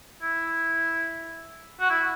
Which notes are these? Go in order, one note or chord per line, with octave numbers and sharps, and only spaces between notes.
E4
F#4
E4